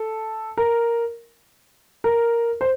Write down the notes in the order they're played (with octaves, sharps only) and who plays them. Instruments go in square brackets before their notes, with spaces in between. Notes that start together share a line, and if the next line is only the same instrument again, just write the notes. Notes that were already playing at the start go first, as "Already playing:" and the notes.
Already playing: [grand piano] A4
A#4
A#4
C5